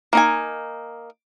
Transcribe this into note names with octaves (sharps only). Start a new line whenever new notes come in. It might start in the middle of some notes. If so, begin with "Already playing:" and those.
A#3 D#4 G#5